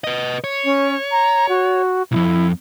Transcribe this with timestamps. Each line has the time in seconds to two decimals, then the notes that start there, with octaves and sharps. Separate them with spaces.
0.04 B4 D#5
0.44 C#5
0.65 C#4
1.11 A#5
1.49 F#4
2.12 B1 F2 E4